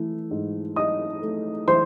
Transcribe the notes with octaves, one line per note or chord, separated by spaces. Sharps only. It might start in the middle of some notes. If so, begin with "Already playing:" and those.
Already playing: E3 A3
G#2
D#4 D#5 D#6
A3
E3 C5 C6